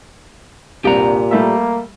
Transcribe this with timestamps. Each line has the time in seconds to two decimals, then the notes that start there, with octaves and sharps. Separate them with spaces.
0.85 C2 G2 A#2 G4 A#5
1.31 G3 A3 A#3 E5